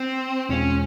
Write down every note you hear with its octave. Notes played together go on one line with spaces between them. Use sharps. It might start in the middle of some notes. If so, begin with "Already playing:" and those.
Already playing: C4
E2 B2 G#3 C4 C#4 F4